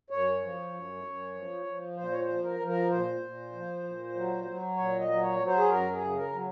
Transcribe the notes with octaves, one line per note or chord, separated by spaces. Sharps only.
F#2 C#5
F3
F#2
F#2
F3
F3
A#2 C5
C#5
C5
F3
A#4
F3
A#4
A#2 C5
A#2
F3
A#2
F#3
F#3
A#2 C#5
D#5
F#3
C#5
F#3
C5
G#4
F#2 A#4
G#4
C#3
A#4
F#3